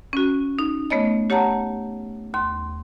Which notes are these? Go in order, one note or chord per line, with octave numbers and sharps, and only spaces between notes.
C#4 F#4
D#4
A3 B3 C#5 D#5
G4 C#5 F#5 A5 A#5
D#2 C6